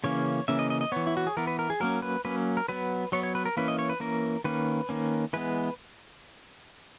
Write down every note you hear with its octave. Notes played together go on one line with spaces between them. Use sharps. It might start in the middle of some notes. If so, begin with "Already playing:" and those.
C#3 E3 A#3 C#4 C#5
C#3 E3 A#3 C#4 E5
D#5
D#5
D#5
E3 B3 C#5
E4
F#4
G#4
E3 B3 A#4
B4
A#4
G#4
F#3 A#3 C#4 A#4
B4
F#3 A#3 C#4 B4
A#4
F#3 B3 B4
F#3 B3 C#5
C#5
B4
A#4
E3 A#3 C#4 B4
D#5
C#5
B4
E3 A#3 C#4 A#4
D#3 A#3 C#4 B4
D#3 A#3 C#4
E3 G#3 B3 B4